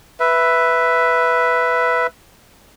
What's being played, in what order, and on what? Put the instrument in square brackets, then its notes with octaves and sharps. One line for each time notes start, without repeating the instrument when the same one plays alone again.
[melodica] B4 E5